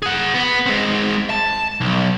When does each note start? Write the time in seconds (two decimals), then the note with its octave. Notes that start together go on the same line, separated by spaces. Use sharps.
0.02 G#4 F#5
0.34 B3
0.66 G#3 C4
1.30 A5
1.81 B1